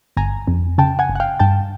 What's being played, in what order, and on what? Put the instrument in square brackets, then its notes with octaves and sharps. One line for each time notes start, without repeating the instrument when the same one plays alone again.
[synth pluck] G1 G#5 A#5
F2
C#3 G5 A5
F#5 G#5
G1
F#5
F5 G5
G2 G5 A5